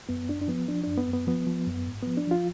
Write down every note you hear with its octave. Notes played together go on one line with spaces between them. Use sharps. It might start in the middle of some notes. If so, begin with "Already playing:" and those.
F#2 B3
F#2 D4
D4
F3 B3
F3 D4
F#2 D4
B3
F#2
B3
F3 B3
F3
F#2
G#2
F3 B3
D4
F3 F4